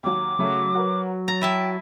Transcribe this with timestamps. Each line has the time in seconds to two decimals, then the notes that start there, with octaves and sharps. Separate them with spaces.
0.03 D#2 F#3 D6
0.39 C#3 F#3 A3
0.75 F#4 A#4 B4
1.28 A#5 A6
1.41 E4 E5 G5 A5 D#7